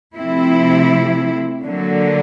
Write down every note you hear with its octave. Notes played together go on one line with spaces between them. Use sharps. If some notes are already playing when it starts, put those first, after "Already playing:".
C3 F3 A3 C4 E4
D3 F#3 A#3